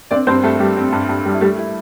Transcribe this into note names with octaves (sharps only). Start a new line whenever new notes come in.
C4 D4 D5
G2 C4 C5
G2 A3 A4
G3 G4
C4
G2
G2
G3
E4
G3 A3 G4
E4